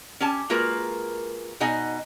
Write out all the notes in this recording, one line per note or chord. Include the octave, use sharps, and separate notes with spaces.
C#4 G4 G#5 A5
G#3 A#3 F4 F#4 A#4 B4
B2 D#4 D#5 F#5 G#5